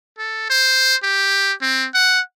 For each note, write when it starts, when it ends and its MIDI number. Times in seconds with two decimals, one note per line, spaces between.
0.18 0.47 69
0.50 0.96 72
1.03 1.53 67
1.61 1.87 60
1.94 2.21 78